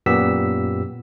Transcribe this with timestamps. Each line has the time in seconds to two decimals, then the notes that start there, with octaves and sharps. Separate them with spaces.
0.06 F#2 A#2 B3 G4 E6 B6